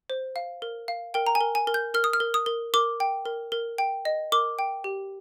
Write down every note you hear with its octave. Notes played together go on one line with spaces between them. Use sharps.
C5
F5
A#4
F5
A#4 G5
A#5
G#5
A#4
G#5
A#4
G6
A#4 F6
D#6
F6
A#4
D#6
A#4
A#4 D6
G5
A#4
A#4
G5
D#5
A#4 D6
G5
G4